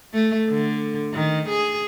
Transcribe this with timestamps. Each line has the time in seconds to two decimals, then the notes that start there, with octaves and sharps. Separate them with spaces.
0.14 A3
0.49 D3
1.13 D#3
1.49 G#4